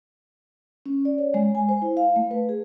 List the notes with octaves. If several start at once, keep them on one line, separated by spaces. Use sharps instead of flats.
C#4
D5
C#5
G#3
G#5
C5
E4
F5
A3
B4
G#4